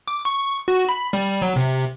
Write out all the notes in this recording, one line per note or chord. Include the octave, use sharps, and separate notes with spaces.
D6
C#6
F#4
B5
G3
F#3
C3